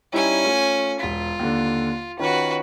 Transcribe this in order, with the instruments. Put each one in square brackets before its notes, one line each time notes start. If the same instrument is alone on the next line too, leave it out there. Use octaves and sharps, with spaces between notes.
[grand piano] G3 D#4 E4 [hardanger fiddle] C#4 G#5
[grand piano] A3 F4
[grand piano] E1 B6 [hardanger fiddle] F4
[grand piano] D#2 D3
[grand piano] D#3 C#4 F4 [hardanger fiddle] F#4 B4